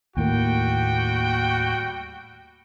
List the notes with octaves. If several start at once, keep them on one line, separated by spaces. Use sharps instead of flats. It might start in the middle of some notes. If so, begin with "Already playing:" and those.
D#2 A2 G3 A#3 F#4 G5